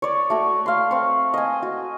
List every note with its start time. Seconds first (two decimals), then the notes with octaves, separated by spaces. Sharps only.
0.02 C#5 D5
0.30 A3 F#4
0.66 F5 C6
0.91 C4 C#6
1.34 D#5 G#5
1.63 F#4